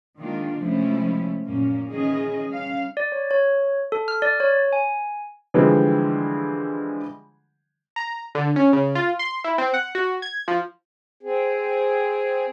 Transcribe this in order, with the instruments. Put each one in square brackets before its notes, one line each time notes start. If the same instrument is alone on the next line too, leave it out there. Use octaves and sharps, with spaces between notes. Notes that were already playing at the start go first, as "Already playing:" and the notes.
[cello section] D#3 G#3 A#3 D4 F4
C3 F3 G#3 A3 C#4 E4
F#2 A#2 A#3 C#4
D#3 E3 C#4 G#4 D#5
G3 C#4 F5
[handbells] D5
C#5
C#5
A4
F6
D5
C#5
G#5
[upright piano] D3 E3 F3 G3 G#3 C4
[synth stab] A#5
D3
C#4
C#3
F4
C6
E4
C4
F#5
F#4
G#6
F3
[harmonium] C4 G#4